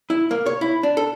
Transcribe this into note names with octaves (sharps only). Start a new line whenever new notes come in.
E4
A#3
C#5
E4
D4
A4